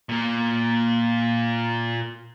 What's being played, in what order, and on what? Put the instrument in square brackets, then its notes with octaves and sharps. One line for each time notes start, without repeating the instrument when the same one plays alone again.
[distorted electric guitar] A#2 A#3